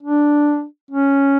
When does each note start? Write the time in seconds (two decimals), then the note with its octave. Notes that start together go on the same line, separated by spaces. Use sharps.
0.03 D4
0.91 C#4